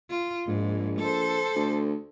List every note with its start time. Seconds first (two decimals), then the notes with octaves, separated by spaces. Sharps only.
0.10 F4
0.47 A#1 G#2
0.99 A4 C5
1.55 D2